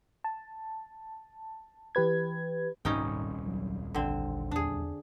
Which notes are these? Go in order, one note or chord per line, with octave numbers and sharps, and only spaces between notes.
A5
E3 G4 B4 G#6
D#1 C2 G#2 C#4 D#4 G5
F#3
A1 D3 C4
E2 D4 G#4